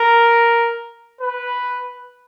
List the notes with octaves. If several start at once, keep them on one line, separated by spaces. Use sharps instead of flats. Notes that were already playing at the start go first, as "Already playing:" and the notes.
Already playing: A#4
B4